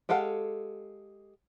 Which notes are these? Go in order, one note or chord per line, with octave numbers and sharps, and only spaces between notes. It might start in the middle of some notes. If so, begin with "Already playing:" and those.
G#3 G4 A4 F5 F#5